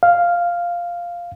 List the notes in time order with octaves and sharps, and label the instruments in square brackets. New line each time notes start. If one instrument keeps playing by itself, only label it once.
[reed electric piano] F5